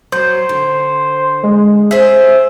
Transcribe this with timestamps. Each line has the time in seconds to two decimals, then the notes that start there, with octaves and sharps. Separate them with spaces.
0.12 F#3 C5
0.49 D3
1.44 G#3
1.91 G#4 C5 E5